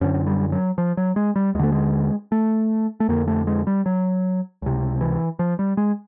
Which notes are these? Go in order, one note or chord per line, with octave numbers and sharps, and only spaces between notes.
F#2 D3 C#4
G3
F#3
F3
F#3
G#3
G3
D#2 D3 G#3 A3
G#3
A3
A3
F2 D3 A#3
A3
G#3
G3
F#3
C#2 C3
E3
F3
G3
G#3